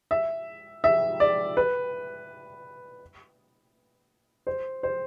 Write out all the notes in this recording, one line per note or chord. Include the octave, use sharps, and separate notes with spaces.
E5
E5
D5
B4
C5
C5